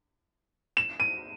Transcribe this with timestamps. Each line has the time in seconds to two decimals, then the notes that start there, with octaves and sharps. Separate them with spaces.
0.77 E7
1.00 D#7